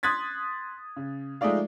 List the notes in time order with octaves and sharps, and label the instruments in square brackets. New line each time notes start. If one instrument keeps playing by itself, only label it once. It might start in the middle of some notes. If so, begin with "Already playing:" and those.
[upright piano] C6 D#6 F#6 G#6 A6 B6
C#3
F3 G#3 A3 D#4 D5 F5